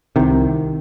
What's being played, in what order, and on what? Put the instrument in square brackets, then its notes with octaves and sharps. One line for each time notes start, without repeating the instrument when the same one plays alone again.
[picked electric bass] C2 C3 D#3